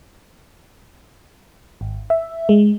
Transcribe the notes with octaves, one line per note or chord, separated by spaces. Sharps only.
G#1
E5
G#3